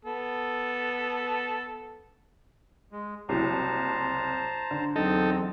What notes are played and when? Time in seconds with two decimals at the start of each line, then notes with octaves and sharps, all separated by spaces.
0.05 B3 A4
2.92 G#3
3.29 F#1 C2 F#3 E4 C5 A5 A#5
4.71 D3
4.96 E2 F#3 C4 D#4 A4